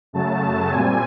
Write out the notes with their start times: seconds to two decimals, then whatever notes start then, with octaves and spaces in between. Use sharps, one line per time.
0.13 F#2 C#3 F#3 A3 A5
0.70 A#2 G3 C4 G#5